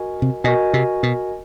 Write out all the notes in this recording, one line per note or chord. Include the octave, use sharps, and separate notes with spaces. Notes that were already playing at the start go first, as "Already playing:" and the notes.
Already playing: F#4 A#4 D#5 G#5
C3
B2 F#4 A#4 D#5 G#5
C3
B2